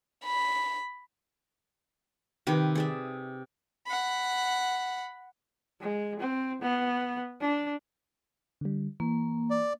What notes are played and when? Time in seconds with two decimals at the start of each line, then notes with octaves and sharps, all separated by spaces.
0.25 B5
2.47 C3 D#3 G4 B4
2.75 G#4 D5 E5
3.87 F#5 B5
5.80 G#3
6.20 C4
6.61 B3
7.41 D4
8.61 D3 G3
9.00 E3 A#3
9.50 D5